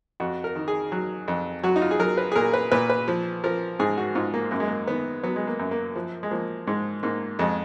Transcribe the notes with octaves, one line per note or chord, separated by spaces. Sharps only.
F2 F#4
A#4
D#3
G#4
F#3
F2
F#3 F#4
D#4
F4
G#4
F#3 A#4
B4
G#4
A#2 A#4
B4
A#2 B4
B4
F3
F3 A#4
G#2 G#4
F#4
G#2 F4
A#3
F#2 A#3
G#3
A#3
D#3 B3
F#3 B3
G#3
A#3
F#2
A#3
F3
G#3
F3 A#3
G#2 G#3
G#2 A#3
F2 G#3